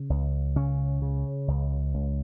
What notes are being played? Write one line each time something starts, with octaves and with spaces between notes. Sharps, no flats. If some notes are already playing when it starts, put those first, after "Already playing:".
Already playing: C#3
C#2
C#3 C#4
C#3
C#2
C#2